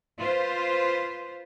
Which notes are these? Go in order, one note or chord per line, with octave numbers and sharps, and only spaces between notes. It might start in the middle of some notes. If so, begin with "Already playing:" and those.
F4 B4 C5